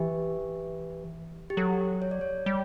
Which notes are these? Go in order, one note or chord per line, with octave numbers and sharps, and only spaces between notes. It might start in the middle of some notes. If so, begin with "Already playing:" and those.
Already playing: E3 G4
G4
F#3 A4
C#5
D5
C#5
G3